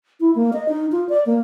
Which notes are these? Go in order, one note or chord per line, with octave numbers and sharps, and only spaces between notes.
E4
A#3
D#5
D#4
F4
D5
A#3